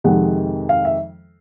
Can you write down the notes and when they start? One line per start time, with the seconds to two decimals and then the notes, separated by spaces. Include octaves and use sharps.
0.04 F2 C3 D#3 G#3 F#5
0.69 F5
0.85 E5